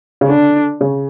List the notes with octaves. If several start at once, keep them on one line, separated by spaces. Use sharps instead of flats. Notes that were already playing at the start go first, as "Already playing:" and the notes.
C#3
D3 D4
C#3